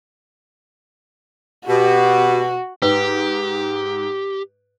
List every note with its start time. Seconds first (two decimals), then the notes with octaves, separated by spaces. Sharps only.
1.68 B2 F#4 G4
2.82 G#2 G4 B4